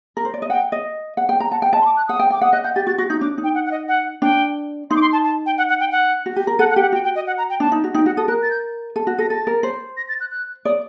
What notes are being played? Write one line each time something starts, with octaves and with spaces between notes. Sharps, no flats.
A#4
C5
D5
D#5
F#5 G5
D#5
F#5
G5
A#5
F#5 A5
F#5 G5
D#5 A5
C6
D6
F#6
F#5 D#6
G5
G5 D6
F#5 D#6
D#5 F#6
F#5 G6
G4 A6
F#4 A6
F#4 A#6
D#4 G6
D4 D6
D#4
G5
F#5
F#5
D#5
F#5
D4 G5
D#4 C6
D6
C6
A5
A5
G5
F#5
F#5
G5
F#5
F#4
G4
A#4
A4 F#5
F#5
G4 G5
F#5
F#4 G5
G5
D#5
F#5
A#5
G5
D4 A5
D#4
F#4
D#4 G5
F#4 F#5
A4 D#6
A#4 F#6
A6
G6
A4
F#4
A4 A#6
A4 A6
A#4
C5
A#6
A6
F#6
F#6
D5 D#6